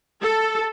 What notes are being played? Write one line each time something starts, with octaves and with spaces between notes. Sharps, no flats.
A4